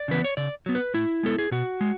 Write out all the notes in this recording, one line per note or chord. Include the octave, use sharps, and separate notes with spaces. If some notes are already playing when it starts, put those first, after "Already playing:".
Already playing: D5
C#3 E3 B3 B4
C#5
C#3 D5
F#3 B3
B4
A2 E4
G#3 B3 A4
G#4
B2 F#4
G#3